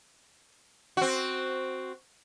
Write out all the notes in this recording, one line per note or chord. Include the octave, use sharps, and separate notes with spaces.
C4 F#4